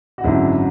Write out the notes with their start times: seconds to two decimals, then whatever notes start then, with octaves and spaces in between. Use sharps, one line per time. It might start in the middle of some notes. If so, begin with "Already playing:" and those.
0.18 F#4
0.24 G#1 F#2 D3 F#3 E4 G#4